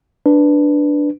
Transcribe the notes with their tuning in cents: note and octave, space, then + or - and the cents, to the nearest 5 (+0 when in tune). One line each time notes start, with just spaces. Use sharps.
D4 +0 B4 +0